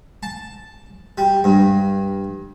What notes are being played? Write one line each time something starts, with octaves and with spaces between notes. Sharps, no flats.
A5
G3
G2